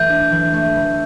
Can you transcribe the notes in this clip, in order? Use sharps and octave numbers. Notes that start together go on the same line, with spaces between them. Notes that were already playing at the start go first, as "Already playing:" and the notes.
Already playing: E3 A3 G6
D4
E3
A3
E3